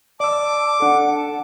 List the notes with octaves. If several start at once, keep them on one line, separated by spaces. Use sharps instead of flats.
D5 A5 D6 E6
D4 A4 F#5
A5